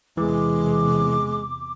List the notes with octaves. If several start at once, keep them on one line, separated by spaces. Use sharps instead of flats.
E2 C3 E3 G#3 D6